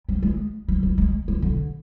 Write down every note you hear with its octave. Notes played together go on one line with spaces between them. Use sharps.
G3
G#3
G3
G3
G#3
G3
D3